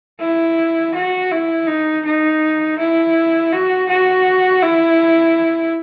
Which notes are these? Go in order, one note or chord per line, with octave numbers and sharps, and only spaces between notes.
E4
F#4
E4
D#4
D#4
E4
F#4
F#4
E4